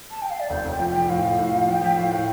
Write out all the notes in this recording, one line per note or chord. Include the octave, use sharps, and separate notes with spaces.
A5
G5
F5
D5
F1 C5
F1
G5
F3
G5
F3
A2 F5
F3
A2
F3
F3 G5
F3 G5
A2 F5
A2 G5